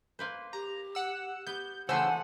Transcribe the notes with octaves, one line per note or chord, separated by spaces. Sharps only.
A#3 B4 C5
G4 A#5
F#5 E6
B3 G4 G6
C#3 E3 F3 A3 C5 F#5 G#5 E6